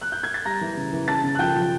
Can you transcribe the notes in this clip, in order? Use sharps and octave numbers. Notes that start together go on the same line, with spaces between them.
F#6
G6
G#6
A6
G3 A#5 A#6
E3
C#3
E3
C#3 A5 A6
C#3
F#6
F3 G5 G6
F3